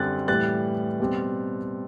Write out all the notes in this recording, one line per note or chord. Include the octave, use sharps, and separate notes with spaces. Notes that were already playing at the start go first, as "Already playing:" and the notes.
Already playing: F#2 D3 G3 C4 F#6 A6
A2 E3 G3 F#6 A6
B2 G3 C4